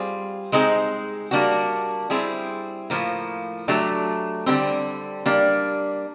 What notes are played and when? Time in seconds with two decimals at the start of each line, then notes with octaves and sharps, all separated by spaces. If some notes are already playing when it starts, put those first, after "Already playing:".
Already playing: G3 C4 F4 G#4
0.52 G#3 C4 D#4 G#4
1.31 G3 A#3 D4 F#4
2.10 G3 C4 E4 G#4
2.90 A2 F3 A#3
3.68 F#3 A3 D4 G4
4.46 D3 G3 C4
5.26 G3 A#3 D4